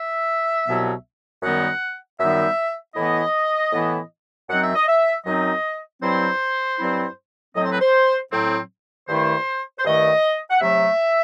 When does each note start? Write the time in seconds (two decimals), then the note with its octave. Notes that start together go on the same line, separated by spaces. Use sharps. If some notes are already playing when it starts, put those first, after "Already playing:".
Already playing: E5
0.66 C2 B2 F#3 B3
1.42 F#2 D#3 G3 B3 D#4 F#5
2.19 F#2 D#3 G3 B3 D#4 E5
2.95 A2 E3 B3 E4 D#5
3.72 A2 E3 B3 E4
4.49 F#2 F#3 C4 D#4 F#5
4.61 E5
4.75 D#5
4.88 E5
5.26 F#2 F#3 C4 D#4 D#5
6.02 G2 F#3 C4 E4 C5
6.78 G2 F#3 C4 E4
7.55 A2 F#3 C4 D#5
7.64 C5
7.72 B4
7.81 C5
8.32 A2 F#3 C4
9.08 G2 D#3 A3 E4 C5
9.78 C5
9.85 G2 D#3 A3 E4 D#5
10.50 F#5
10.61 C3 F#3 A3 E5